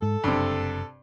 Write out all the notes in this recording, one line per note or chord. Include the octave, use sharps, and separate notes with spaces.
G#2 A4
F#1 G2 C3